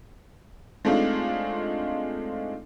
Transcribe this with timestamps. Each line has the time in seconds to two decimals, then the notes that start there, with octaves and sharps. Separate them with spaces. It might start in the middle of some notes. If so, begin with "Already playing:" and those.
0.85 G#3 A3 C4 D4 D#4 F4